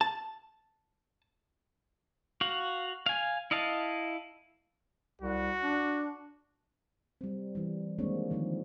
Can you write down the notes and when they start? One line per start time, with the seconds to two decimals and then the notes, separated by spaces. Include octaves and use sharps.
0.01 A5
2.41 F#4 F5
3.06 F5 G#5
3.51 E4 D#5 F5 A5
5.22 C2 F#4
5.63 D4
7.21 G3 C4
7.55 E3 G3
7.98 D#3 G#3 A#3 C4 D4 C#5
8.30 D3 D#3 F3 A3 C4